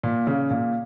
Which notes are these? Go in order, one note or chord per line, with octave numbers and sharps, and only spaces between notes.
A#2
C#3
A#2